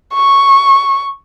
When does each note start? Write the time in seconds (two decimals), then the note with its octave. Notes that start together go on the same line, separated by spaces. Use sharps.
0.14 C#6